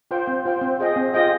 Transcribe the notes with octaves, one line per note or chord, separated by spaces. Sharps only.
F4 C5 G5
C4
F4 C5 G5
C4
F4 G#4 D#5 G5
C4
F4 G#4 D#5 G5